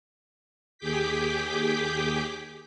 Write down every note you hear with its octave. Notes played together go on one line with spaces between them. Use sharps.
D#2 G4 G#4 D6 G6 B6